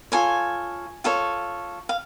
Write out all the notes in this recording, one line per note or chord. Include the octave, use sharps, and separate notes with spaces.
F4 A4 C#5 G#5
F4 A4 C#5
F5